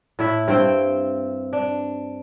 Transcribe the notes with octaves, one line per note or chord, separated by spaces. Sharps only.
A2 E4 E5
G2 C4 G5
D4